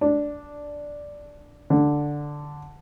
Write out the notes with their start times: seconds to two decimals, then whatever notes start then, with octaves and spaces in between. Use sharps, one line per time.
0.01 D4
1.70 D3